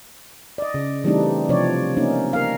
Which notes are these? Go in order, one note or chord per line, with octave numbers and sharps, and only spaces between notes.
D5 D#5
C#3
E3 G3 A3 C4 D4 D#4
C3 F3 C4 D4 C#5 D5
A#3 C#4 D#4
A#4 F5